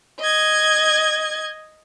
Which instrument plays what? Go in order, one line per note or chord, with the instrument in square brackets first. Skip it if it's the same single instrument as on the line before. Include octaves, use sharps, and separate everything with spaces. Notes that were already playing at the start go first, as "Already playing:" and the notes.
[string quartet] D#5 G#6